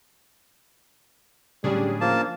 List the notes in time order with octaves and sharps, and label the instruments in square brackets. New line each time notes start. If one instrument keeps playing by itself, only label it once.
[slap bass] A2 D3 F#3 [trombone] G3 [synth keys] C#4 D4 G#4
[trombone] F3 [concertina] A#3 A5